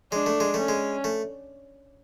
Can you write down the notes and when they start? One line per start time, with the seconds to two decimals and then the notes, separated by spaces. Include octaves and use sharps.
0.12 G#3 D4
0.26 A3
0.40 G#3
0.54 A3 C#4
0.69 G#3
1.04 A3